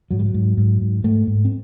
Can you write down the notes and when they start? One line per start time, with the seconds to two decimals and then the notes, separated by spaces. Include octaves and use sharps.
0.11 G#2 F#3
0.19 G3
0.25 F#3
0.34 G#2
0.57 G#2
0.81 G#2
1.04 G#2 A3
1.27 G#2
1.45 C4